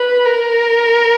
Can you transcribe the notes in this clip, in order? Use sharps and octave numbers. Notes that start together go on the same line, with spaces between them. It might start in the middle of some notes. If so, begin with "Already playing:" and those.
Already playing: B4
A#4